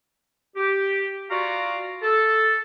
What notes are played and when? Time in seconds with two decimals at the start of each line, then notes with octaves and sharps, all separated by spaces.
0.56 G4
1.30 F4 F#4 D5 F5 A#5 C#6
2.03 A4